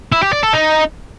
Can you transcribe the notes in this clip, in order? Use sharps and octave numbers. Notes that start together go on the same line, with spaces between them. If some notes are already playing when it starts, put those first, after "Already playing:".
E4
G4
D5
A4
D#4